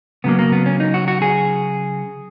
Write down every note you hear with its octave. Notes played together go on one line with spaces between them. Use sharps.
C#3 F#3 A#3 B3
A#3
B3
C#4
D#4
F#4
F#4
G#4